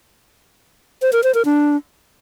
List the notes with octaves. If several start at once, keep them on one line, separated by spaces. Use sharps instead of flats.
C5
A#4
C5
A#4
D4